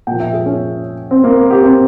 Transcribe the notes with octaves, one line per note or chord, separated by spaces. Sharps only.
A#2 F3 G5
E5
G#4
C#4
C4
A#3
G4
C4